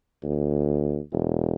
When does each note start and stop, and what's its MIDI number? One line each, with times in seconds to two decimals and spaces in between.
0.23 0.99 38
1.13 1.55 28